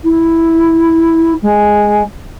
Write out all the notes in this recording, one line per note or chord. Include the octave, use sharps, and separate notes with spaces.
E4
G#3